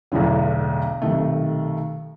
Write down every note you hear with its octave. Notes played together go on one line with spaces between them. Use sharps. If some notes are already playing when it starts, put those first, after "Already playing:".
B1 E2 A2 D3 F#3
B1 C3 D#3 A3